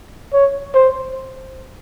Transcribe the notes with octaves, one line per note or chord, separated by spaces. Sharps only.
C#5
C5